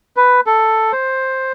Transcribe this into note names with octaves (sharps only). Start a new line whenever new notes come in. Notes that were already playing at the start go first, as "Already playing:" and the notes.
B4
A4
C5